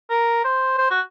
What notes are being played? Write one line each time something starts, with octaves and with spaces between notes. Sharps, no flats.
A#4
C5
C5
F#4